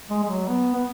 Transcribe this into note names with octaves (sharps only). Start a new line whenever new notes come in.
G#3
G#3
F#3
B3
B3